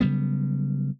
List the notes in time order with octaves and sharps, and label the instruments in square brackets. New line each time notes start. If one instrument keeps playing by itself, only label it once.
[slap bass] C#3 F#3 G3 B3